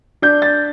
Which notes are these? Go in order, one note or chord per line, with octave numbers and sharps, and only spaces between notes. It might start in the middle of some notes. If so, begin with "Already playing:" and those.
D4 G6
A6